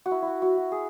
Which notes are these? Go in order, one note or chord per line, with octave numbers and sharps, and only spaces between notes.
F#4
E4
E4 F#4
F#4
F#4
G#4